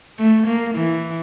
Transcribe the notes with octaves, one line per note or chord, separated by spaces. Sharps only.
A3
A#3
E3